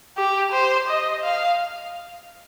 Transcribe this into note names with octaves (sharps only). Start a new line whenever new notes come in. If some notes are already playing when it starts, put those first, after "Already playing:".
G4
C5
D#5
F5